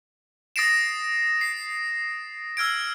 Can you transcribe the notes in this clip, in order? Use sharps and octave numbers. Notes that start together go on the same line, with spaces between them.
D#6 A6 A#6 C7 D7 E7
C7
E6 F6 G#6 D7